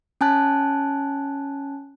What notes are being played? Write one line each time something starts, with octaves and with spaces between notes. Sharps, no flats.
C#4 G#5 A5 F#6